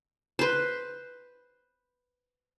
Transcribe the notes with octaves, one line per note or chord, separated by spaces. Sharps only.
B4 C5